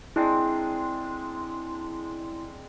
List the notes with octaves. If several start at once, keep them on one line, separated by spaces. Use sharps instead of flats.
G#3 C4 D4 E4